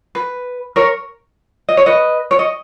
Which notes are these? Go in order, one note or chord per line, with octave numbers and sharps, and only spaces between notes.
B4
A#4 C#5
D#5
C#5
B4 D#5
C#5
D#5